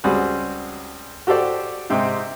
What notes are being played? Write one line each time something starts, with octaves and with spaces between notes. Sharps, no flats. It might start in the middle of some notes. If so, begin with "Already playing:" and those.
C#2 G3 C4 F#4 G#4 F#5
F#4 G4 A4 C5 D5 G5
G#2 C3 C4 D#4 G4